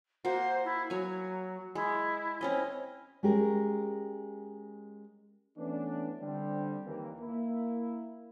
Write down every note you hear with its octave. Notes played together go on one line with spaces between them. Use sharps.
A#3 F#4 C5
E4
F#3 C#5 G#5
G#3 E4
C4 C#4 D#5
G#3 C#4 G4 G#4 A#4
E3 A3 B3 C#4 D4
D3 G3 C4
D#2 E3 A#3
A#3 E4